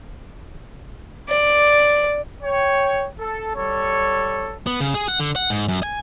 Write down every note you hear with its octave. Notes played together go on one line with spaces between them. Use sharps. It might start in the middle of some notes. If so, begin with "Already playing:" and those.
D5
C#5 G5
A4
G3 A4 C#5
B3
C#3
G#4
F#5
D3
F#5
G#2
F#2
G#5